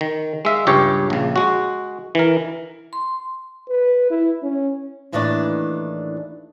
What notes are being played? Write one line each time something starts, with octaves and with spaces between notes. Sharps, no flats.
D#3
G#3 E5 F5
C#2 G2 G4 C#5
A#1 C#3
G#3 F#4
E3 A#4
C6
B4
E4
C#4
D#2 A2 D#3 E3 D4 D5